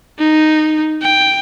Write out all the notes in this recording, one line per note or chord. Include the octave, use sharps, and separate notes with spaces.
D#4
G5